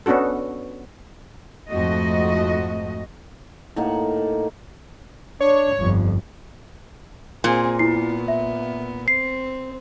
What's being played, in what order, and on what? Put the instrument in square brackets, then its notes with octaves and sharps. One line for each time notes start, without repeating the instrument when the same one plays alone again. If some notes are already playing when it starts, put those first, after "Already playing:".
[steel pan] B3 C#4 D4 F#4 A4
[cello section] F2 G#2 A3 F#4 D#5
[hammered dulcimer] A2 A#3 D#4 F#5
[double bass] D4 [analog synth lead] C#5
[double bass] G1 F2
[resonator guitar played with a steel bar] A#2 [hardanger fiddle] C4 G#4
[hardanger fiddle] B3 [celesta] E4 C7
[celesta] E5
[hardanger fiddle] C4 [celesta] C7